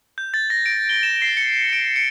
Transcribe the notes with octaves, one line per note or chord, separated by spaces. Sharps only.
G6
A6
A#6
D7
G7
E7
C7
C#7
D7
C#7